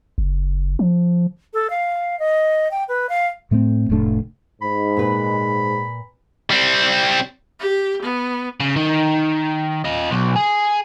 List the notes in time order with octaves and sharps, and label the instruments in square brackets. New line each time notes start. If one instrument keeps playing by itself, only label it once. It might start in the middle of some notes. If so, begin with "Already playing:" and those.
[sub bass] F#1
F3
[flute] A4
F5
D#5
G5
B4
F5
[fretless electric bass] A2 A3 A#3 C4
F1 A2 A3 D4
[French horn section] G#2 [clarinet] B5
[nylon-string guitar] A#2 B4
[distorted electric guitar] G3 C4
[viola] G4
B3
[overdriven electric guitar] C#3
D#3
F4 D#5
B1
G#4